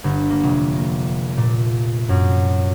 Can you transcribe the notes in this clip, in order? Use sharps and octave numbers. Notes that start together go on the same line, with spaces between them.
G1
A#3
F1
A#3
A#2
F#2